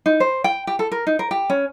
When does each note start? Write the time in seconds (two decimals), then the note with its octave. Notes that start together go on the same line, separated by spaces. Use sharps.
0.06 D#4
0.20 C5
0.44 G5
0.67 G4
0.79 A4
0.92 A#4
1.07 D#4
1.19 A#4
1.31 G4
1.50 C#4